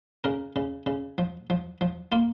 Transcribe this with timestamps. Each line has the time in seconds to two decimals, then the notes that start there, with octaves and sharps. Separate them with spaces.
0.24 C#3 A#4
0.56 C#3
0.86 C#3
1.18 F3
1.50 F3
1.81 F3
2.12 A#3 F4